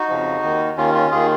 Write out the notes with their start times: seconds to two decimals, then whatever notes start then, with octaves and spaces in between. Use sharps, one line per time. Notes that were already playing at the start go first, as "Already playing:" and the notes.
Already playing: D#4 F#4
0.08 F2 C#3 F3
0.43 D#2 D#3
0.77 D#2 D#3 C#4 F4
0.94 C#4 F4
1.11 D#2 D#3 F4 G#4